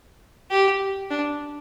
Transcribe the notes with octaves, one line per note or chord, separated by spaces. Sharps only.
G4
D4